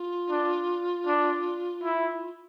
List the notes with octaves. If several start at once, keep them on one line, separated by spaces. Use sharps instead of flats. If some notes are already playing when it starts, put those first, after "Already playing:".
Already playing: F4
D4
D4
E4